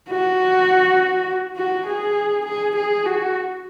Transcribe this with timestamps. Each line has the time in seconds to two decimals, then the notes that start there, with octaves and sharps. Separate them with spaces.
0.10 F#4
1.57 F#4
1.86 G#4
2.45 G#4
2.76 G#4
3.05 F#4